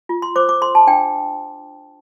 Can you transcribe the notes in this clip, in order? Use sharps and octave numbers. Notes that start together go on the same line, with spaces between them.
F4
C6
C5 D6
D6
A4 C6
A5
D4 G5